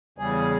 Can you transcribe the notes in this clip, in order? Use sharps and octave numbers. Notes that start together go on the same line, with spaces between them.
E2 C#3 G3 G#4